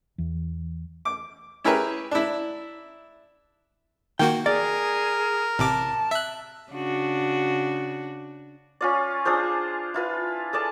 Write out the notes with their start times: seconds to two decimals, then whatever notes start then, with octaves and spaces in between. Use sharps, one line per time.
0.18 E2
1.05 D6
1.64 C#4 E4 G4 G#4 A#4 B4
2.11 D4 E4
4.19 D#3 A#3 F#4 G5
4.46 G#4 A#4 D5
5.59 A1 C3 A5 D6
6.11 E5 F#6
6.72 C#3 D4 F#4
8.81 C#4 F4 D5
9.25 D4 F4 G#4 C5
9.94 E4 F4 B4
10.53 G#4 A4 D5 A5